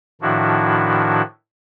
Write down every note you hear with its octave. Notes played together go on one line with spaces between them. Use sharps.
A2 D#3 F3 D4 E4 F#4